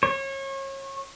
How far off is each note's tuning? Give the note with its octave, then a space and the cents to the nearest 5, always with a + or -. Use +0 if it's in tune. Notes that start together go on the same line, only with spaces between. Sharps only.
C#5 -30